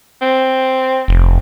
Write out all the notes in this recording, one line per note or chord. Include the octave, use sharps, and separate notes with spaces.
C4
F1